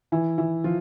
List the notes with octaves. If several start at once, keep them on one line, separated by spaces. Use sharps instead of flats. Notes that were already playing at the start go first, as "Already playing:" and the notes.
E3 E4
E3 E4
F3 F4